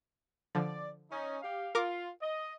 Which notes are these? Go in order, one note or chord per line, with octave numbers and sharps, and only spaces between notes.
D3 F3 D5
C#4 D#4
G4 F5
F4 A#4 D6
D#5